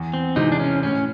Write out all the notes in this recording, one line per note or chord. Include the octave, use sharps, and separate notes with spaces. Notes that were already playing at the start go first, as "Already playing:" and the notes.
Already playing: E2
C4
C3 E3 G#3 D#4
D4
C#4
A2 C#4